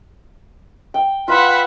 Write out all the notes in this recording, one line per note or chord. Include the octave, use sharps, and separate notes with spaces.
G5
F4 B4 E5 F#5